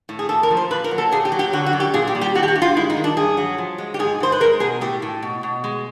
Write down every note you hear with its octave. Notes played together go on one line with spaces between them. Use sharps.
A2
G#4
A#2 A4
A#4
F3
C5
A#2 B4
A#4
F#3
A4
A#2 G#4
G4
F#3
G4
D3 F#4
F#4
F#2
G4
A#2 G#4
G4
G3
G4
D#3 F#4
G4
F#4
G2
F4
G#3 E4
D#4
D#3
D4
G2 G#4
F#3
F3
G#3
G4
G#2 G#4
G#2 C5
B4
G#3 A#4
B2 G#4
A2 G4
A2
B2
B2
G#3